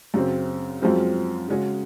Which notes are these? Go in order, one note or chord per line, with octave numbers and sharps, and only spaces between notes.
F#2 C#3 F#3 C4
F#2 F3 G#3 C4
C#3 G#3 C#4 F#4